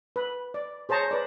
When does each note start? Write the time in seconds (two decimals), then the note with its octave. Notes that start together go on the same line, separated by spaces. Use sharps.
0.16 B4
0.54 D5
0.89 G#4 C5 C#5 A5 A#5
1.11 B4 D5